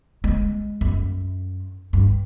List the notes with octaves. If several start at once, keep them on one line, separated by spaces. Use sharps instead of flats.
G#3
F#2
G2